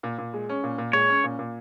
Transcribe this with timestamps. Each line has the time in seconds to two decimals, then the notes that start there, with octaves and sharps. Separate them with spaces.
0.03 A#2
0.18 A#2
0.33 G#3
0.49 C#4
0.63 A#2
0.78 A#2
0.93 G#3 C#5
1.09 C#4
1.24 A#2
1.39 A#2